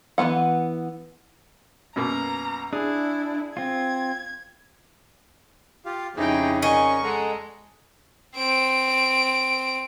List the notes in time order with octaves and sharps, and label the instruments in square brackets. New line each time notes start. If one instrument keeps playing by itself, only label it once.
[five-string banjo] E3 F#3 B3 F#5
[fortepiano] F#2 B2 A#3 [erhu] A#5
[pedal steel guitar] D4 [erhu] E4 [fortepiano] G#4
[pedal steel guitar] C4 F4 [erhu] G#6
[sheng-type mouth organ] F4 G4 F5
[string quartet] F2 C#3 C#4 [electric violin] D#4 G5 [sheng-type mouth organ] E4 G4 G#4
[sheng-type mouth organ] A#4 [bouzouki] D#5 G#5 [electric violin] C#6
[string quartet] G#3 [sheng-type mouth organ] A4 F#5 A#5
[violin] C4 D7